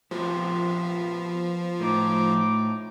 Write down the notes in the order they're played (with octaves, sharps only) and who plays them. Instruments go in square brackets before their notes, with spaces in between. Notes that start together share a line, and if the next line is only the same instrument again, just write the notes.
[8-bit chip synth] F3 [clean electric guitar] B3 G4 C5
[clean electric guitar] A2 [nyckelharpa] D#4 D6